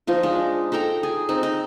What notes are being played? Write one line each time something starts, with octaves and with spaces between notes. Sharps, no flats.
F3 D#4 F4
G#3 D4 D#4
D#4 A4 G5 A#5
G#4
C4 D#4
D#4